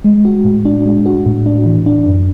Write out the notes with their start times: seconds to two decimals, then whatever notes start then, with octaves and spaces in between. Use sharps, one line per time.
0.04 G#3
0.25 F#4
0.45 A2
0.65 D4
0.86 G#3
1.06 F#4
1.26 A2
1.46 D4
1.66 E3
1.86 D4
2.06 F#2